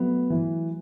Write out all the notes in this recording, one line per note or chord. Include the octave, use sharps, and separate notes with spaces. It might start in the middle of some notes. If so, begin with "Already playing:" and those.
Already playing: F#3 A3 B3
E3